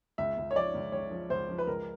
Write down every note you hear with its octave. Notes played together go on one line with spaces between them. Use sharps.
C#2 E5
C#2
C#5
F3 D5
C#2
C#2 C#5
F3
C#2 C5
F3
B4
C#2 A#4